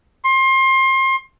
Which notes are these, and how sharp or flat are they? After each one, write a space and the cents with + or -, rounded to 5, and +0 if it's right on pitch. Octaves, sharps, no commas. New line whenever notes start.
C6 +30